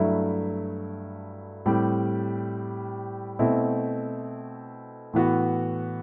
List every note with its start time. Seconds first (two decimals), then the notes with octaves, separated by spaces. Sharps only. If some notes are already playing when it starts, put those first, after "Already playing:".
Already playing: G2 F#3 A3 E4
1.66 A2 G3 C4 G4
3.39 B2 A3 C4 E4
5.13 A2 E3 B3 F#4